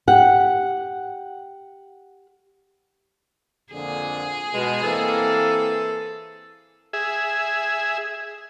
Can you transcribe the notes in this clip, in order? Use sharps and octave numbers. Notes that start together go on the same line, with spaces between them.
G4 F#5
F2 A#2 D3 G#4
B2 G#3
E3 A#3 C4 A4
G#4 E5